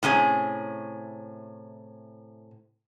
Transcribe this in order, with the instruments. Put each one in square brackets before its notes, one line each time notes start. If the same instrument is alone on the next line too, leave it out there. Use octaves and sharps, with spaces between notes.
[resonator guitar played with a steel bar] A2 C3 C#4 G#4